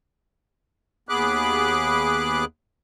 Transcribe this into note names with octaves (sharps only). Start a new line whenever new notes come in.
D#2 B3 G#4 B5 D6 F#6